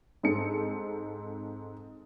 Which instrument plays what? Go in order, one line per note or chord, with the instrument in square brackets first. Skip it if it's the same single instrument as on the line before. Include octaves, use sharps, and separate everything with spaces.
[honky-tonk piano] G#2 C4 A4 C#7